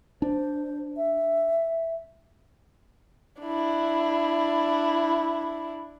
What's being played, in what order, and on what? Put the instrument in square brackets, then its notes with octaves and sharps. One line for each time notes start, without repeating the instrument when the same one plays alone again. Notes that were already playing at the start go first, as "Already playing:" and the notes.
[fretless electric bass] D4 [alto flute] C5
[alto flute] E5
[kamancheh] D4 E4